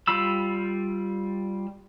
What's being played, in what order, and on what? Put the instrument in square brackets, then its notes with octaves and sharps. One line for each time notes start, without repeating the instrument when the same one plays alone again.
[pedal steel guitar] G3 F4 B5 E6